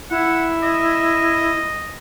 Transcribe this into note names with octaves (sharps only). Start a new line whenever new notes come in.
E4 F#5
D#5